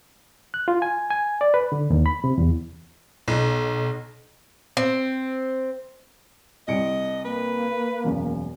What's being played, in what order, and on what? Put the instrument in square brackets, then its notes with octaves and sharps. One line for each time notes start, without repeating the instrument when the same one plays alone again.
[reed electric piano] F#6
F4
G#5
G#5
D5
B4
D3
D#2
B5
C3
E2
[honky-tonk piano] B1
[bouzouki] C4
[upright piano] C2 C#7 D7 [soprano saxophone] D#5
[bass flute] A#3 [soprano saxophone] B4
[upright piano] E1 F#2